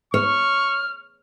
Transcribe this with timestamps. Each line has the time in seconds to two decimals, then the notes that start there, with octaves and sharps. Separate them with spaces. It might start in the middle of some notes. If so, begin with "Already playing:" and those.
0.14 C#5 C#6 F6